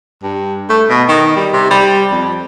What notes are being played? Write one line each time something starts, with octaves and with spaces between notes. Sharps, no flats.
G2
A3
B2
D#3
G3
C3
G3
F2